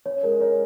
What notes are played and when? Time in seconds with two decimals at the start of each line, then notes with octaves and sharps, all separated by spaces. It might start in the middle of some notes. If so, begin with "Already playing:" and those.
0.06 C#4 C#5
0.23 G#3 A#4
0.40 A#4 C#5